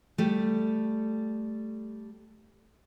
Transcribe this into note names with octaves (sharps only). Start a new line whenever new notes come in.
G3 A3